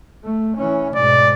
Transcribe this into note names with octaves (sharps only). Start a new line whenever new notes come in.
A3
E3 C#4
G#2 B2 D5